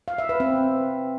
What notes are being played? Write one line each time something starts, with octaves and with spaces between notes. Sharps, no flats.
F5
E5
B4
C4